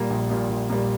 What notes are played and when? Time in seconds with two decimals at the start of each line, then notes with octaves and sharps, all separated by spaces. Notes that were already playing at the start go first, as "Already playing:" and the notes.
Already playing: A#2 G3 A#3
0.10 A#1
0.30 A#2 G3 A#3
0.49 A#1
0.70 A#2 G3 A#3